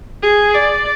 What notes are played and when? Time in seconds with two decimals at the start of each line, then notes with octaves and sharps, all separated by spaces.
0.23 G#4
0.54 D5